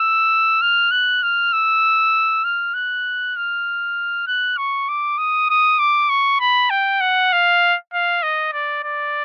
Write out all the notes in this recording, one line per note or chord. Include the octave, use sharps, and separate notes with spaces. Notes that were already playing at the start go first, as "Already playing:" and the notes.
Already playing: E6
F6
F#6
F6
E6
F6
F#6
F6
F#6
C#6
D6
D#6
D#6
D6
C#6
B5
G5
F#5
F5
F5
D#5
D5
D5